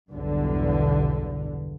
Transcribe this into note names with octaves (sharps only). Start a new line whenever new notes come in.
B1 E2 G2 D3